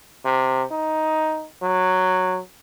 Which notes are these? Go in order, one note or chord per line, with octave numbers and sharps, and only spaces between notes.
C3
D#4
F#3